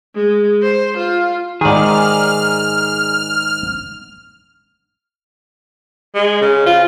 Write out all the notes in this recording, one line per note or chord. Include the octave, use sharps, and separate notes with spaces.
G#3
C5
F4
G#2 D#3 G#4 D5 F6
G#3
C#3
F4